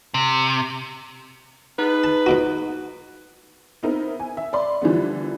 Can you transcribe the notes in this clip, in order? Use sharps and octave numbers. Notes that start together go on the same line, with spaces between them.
C3
D#4 G#4 B4
A5
G#2 B2 F#4
B3 C4 D#4 E4 A#4
G#5
E5
D5 B5 C6
D3 E3 F3 G3 B3